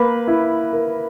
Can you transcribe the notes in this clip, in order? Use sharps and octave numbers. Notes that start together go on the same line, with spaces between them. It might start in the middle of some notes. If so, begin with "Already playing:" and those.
Already playing: A#3 B4
E4
A#4